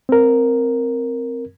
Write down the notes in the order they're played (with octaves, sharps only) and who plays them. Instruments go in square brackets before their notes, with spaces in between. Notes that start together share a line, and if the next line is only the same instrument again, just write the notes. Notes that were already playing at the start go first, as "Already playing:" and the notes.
[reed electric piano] C4 A#4